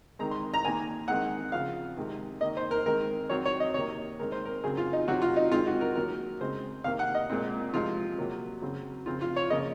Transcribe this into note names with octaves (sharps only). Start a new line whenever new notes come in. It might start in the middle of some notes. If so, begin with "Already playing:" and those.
D#3 G#3 C4 A#5
C6
A#5
D#3 A#3 G#5
D#3 G#3 C4 F#5
C#3 F3 C4 F5
C3 D#3 G#3 C4
D#3 A#3 D#5
C5
A#4
D#3 G#3 C4 A#4
D#3 F#3 C4 C#5
C#5
D#5
C3 D#3 A#3 C#5
D#3 G#3 C4 A#4
C5
A#4
C#3 F#3 C4 G#4
F4
D#4
C3 F#3 C4 F#4
F4
D#4
D#3 G#3 C4 F4
F#4
A#4
D#3 F#3 A#3 A#4
C#3 G#3 C4 C5
C3 D#3 A#3 F5
F#5
D#5
A#2 G#3 C4
C3 F3 G#3 C4 F4
C3 F#3 A#3
C#3 F#3 C4
C#3 F3 C4 F4
F4
C#5
C#3 F3 A#3 D#5